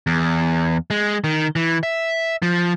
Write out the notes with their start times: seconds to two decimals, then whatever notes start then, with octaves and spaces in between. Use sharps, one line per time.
0.07 E2
0.90 G#3
1.24 D#3
1.56 E3
1.83 E5
2.43 F3